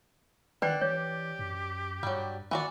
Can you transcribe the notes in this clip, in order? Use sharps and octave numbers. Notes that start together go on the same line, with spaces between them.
D#3 D4 B4 D5 F#5 G5
E3 G4 C#5
F#2
G2 F#3 G3
D#3 E3 F#4 D5